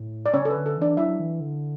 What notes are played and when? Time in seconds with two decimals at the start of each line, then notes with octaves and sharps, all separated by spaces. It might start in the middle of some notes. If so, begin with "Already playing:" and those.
Already playing: A2
0.26 D5
0.34 C#3 C#4 C#5
0.45 A4
0.50 B4
0.55 D3
0.66 A4
0.77 E3 D4 D5
0.97 F#3 E4 E5
1.19 E3
1.40 D3